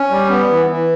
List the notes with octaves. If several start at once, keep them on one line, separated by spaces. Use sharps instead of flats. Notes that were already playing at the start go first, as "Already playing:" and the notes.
Already playing: C#4
G3
B3
E3
E3